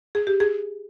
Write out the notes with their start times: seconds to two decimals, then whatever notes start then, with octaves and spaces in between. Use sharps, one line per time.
0.15 G#4
0.27 G4
0.40 G#4